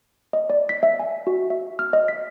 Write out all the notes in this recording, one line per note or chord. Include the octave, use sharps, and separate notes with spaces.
D#5
D5
B6
E5
G#5
F#4
E5
F6
D#5
B6